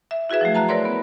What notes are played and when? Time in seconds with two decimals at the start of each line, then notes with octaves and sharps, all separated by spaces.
0.11 E5
0.30 E4 F#4 G#4 B4 E5
0.41 F3 F#3 A3
0.55 A5 A#5 F#6
0.69 E4 A#4 B4 C#5 D5 C6
0.85 B3